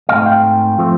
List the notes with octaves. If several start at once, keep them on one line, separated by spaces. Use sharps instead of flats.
G#2 E3 A3 C4 D#5 F5
F5 G5
F3 A3 C4